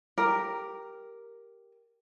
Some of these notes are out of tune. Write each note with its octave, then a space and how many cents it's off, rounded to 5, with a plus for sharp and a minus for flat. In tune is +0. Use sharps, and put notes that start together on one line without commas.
G4 +0 A#4 +0